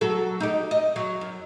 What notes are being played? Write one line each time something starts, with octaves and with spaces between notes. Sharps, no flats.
F#3 F#4 A4
D#4 G4
D#5
F#3
F#2